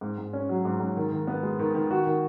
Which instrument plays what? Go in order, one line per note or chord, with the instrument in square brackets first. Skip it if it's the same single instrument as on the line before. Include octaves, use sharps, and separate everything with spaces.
[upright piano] G#2
G#2
C#4
F#3
G#2
G#2
D#3
D#3
B3
G#3
D#3
D#3
F#4
D#3